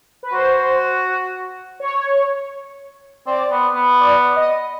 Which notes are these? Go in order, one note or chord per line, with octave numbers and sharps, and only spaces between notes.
B4
F#4 C5
C#5
C4 D5
B3
B3
D5
D#5